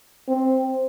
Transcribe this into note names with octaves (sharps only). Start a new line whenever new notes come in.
C4